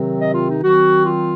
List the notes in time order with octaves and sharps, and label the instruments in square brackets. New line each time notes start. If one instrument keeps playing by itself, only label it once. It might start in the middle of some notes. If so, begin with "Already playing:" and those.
Already playing: [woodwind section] C3 D#3 F#3 C4
D#5
F4
D#4
D#3 F#3 C4 F#4
F4